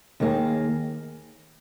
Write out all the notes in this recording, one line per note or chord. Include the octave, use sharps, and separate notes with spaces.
D#2 D#3 A#3 G#4